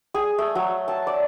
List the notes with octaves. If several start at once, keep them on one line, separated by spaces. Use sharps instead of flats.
G#4
A3
F#3
A5
D5